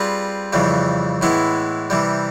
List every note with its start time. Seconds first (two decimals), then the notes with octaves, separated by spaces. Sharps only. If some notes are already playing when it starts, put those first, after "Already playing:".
Already playing: G3 C4 F4 G#4 B4
0.53 F2 C#3 E3 G3
1.22 A2 E3 G#3 B3 E4
1.90 C3 E3 G3